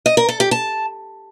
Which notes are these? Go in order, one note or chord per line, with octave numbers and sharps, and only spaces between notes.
D#5
A#4
A4
G4
A5